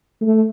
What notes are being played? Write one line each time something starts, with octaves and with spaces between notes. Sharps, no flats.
A3